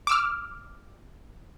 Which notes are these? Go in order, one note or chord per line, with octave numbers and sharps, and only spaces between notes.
D6 E6 F6